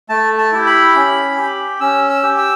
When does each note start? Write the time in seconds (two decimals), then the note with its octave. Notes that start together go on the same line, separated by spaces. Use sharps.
0.09 A3 A5
0.38 A5
0.52 E4 G4
0.66 B5
0.95 C#4
1.38 G4
1.81 C#4 E6
2.09 E6
2.23 G4
2.38 E6